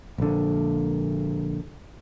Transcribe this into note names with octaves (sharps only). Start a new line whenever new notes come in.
A#1 D3